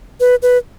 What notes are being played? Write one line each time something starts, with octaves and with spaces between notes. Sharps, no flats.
B4
B4